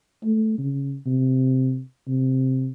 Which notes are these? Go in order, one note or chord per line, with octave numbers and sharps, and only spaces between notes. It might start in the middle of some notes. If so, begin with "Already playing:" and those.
A3
C#3
C3
C3